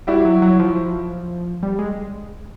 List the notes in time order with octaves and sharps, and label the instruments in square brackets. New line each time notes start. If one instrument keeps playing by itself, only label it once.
[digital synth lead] G3 [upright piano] E4 F#4
[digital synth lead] F#3
F#3
F3
G3
G#3